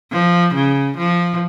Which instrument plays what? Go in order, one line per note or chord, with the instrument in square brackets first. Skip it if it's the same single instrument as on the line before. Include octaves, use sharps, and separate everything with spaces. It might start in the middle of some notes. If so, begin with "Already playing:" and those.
[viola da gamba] F3
C#3
F3